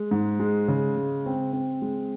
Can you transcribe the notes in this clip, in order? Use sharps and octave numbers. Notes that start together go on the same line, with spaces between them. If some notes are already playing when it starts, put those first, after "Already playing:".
Already playing: G#3
G#2
G#3
C#3
G#3
C4
C4
G#3